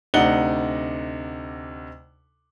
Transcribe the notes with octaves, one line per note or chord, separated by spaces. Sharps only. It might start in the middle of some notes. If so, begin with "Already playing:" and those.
D2 C3 D#4 D5 F#5 G7